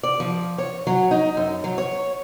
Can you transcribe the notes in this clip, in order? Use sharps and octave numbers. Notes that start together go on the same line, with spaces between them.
D5
F3
C#5
F#3
D#4
F#2
F#3
C#5